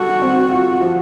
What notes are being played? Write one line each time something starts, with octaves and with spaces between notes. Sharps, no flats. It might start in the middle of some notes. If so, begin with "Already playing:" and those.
Already playing: G3 F#4 A4
C4
F4
F3